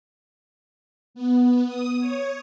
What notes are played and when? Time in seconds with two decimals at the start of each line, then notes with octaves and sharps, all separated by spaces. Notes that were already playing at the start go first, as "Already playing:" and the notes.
1.14 B3
1.67 D#6
2.00 C#5